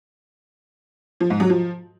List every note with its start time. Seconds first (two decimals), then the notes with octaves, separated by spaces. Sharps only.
1.20 F3
1.30 G#2
1.40 F#3
1.50 F3